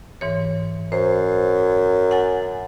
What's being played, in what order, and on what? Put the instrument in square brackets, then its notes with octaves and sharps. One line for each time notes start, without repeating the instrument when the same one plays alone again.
[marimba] G#2 E3 C#5
[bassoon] F#2 [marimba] C5
[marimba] F#5 G#5 A6